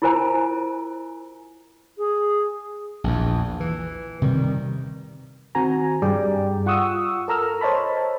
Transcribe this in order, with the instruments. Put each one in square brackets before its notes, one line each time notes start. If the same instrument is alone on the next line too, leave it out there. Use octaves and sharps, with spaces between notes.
[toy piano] E4 F4 A#4 C5 G#5 A#5
[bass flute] G#4
[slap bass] A#1 E2
E3
C3 D#3 F3 G3
[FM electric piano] D#3 C4 F#4 G#5 A#5
G2 G3 G#4 D5 G5
F4 F#5 C#6 D#6 E6
A4 A#4 A#5 E6 F6
C5 C#5 D#5 A5 B5